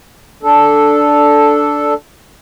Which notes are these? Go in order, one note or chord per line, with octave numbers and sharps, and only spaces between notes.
D4 A4